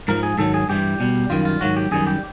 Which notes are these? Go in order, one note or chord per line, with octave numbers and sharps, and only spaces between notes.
G#2 F3 A#4
G#4
G#2 D#3 F#3 A4
G#4
G2 E3 G3 G4
B2 G3
F#2 D#3 G3 F4
F4
G#2 D#3 F#3 F#4
G4
F#2 D#3 G3 G#4
G4